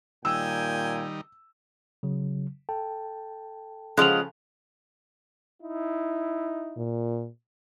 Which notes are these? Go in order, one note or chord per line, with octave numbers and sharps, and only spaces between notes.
A#2 D#3 G3 D#4 G5 G#5 E6
C#3 F#3
A4 G5 A5
C#3 F3 G#3 F4 F#5 F#6 F7
D#4 E4
A#2